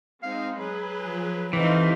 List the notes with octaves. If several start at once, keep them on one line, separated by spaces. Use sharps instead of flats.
G#3 C4 D#4 F5
F#3 G#4 B4
F3
E3 C4 D#4 G4 A4 F5